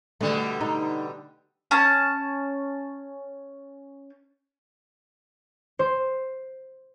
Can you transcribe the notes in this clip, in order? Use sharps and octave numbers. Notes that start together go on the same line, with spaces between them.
B2 D3 G3 A3
D#4
C#4 A5
C5